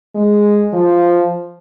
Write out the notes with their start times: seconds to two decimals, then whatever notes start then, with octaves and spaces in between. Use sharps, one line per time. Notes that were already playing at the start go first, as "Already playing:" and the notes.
0.15 G#3
0.73 F3